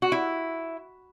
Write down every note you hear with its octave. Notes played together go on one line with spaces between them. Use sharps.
F#4
E4